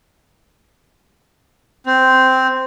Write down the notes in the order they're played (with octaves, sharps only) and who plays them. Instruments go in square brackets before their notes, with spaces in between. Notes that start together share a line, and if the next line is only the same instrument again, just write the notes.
[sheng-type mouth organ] C4